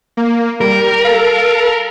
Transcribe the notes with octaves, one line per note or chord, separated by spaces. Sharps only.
A#3
G3 A#4
A4 F5